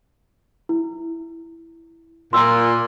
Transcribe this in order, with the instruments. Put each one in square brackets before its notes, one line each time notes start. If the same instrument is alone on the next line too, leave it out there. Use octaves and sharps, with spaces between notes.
[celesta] E4
[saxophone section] A#2 [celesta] C6 E6